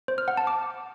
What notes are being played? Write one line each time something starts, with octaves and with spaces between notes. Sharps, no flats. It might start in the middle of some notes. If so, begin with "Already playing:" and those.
C5
F6
F#5
A5
D6